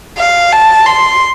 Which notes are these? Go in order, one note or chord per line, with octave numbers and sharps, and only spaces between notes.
F5
A5
C6